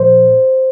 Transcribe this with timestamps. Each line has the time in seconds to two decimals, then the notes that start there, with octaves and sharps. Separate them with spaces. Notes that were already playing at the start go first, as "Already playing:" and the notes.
Already playing: A#2 F3 C5